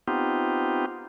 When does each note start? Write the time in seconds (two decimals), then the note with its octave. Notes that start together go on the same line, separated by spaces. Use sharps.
0.08 B3 C4 D#4 F4 G4